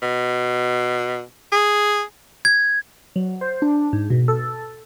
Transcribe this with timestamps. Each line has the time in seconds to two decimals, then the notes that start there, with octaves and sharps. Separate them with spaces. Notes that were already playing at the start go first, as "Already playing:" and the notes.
0.02 B2
1.52 G#4
2.45 G#6
3.16 F#3
3.41 C5
3.62 D4
3.93 G#2
4.10 B2
4.28 A4